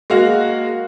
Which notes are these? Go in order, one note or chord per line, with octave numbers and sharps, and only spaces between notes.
G#3 A#3 F#4 F5